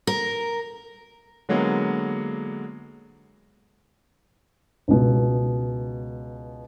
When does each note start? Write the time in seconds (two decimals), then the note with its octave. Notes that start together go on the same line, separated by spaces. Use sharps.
0.07 A#4
1.49 D3 F#3 G#3 A#3 B3
4.88 C#2 B2